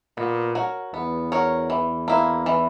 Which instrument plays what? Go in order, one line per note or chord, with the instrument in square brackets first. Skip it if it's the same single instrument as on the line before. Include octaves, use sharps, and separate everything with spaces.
[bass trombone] A#2 [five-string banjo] B3
[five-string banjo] F#4 A#4 C#5
[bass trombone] E2 [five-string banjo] B3
[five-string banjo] F#4 A#4 C#5
E3
A#3 E4
E3